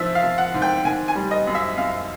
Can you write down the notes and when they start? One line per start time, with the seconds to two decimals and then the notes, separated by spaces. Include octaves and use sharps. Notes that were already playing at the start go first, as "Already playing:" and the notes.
Already playing: G#2 F3 E5
0.15 F5
0.23 F3
0.38 F#5
0.54 G#2
0.62 G5
0.85 D#3 G#5
1.08 G#5
1.15 G3
1.31 D#5
1.47 F#2
1.55 E5
1.78 F#2 F5